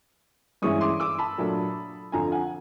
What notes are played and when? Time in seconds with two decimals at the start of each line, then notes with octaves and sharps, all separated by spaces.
0.62 G2 E3 G#3 C#4 E4 C#6 D#6
0.81 C6 D6
1.00 D6 E6
1.19 A5 B5
1.38 A#2 F#3 A3 D4
2.12 F2 D3 F3 G#5 A#5
2.32 F#5 G#5